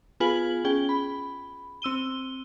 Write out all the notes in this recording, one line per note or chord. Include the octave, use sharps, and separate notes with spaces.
B3 F4 G#4 B4 G#5 F#7
C#4 G#4 G5 G7
B5
C4 E6 D#7 G7